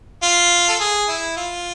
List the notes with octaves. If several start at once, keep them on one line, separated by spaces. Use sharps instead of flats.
F4
A4
G#4
E4
F4